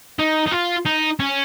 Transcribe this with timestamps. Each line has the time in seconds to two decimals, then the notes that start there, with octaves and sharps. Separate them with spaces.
0.19 D#4
0.47 D#4
0.52 F4
0.86 D#4
1.19 C#4